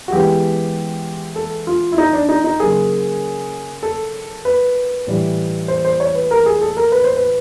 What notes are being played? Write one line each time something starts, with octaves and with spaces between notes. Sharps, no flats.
F#4
E3 G#3 B3 G4
A4
F4
E4
D#4
D4
D#4
D#4
C#3 F#3 A#3 G#4
A4
B4
A2 E3 G3
C5
C5
C#5
B4
A#4
G#4
A4
A#4
B4
C5
B4